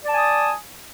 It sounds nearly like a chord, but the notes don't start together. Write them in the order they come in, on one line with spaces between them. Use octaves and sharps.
D5 A5 G#5 D#6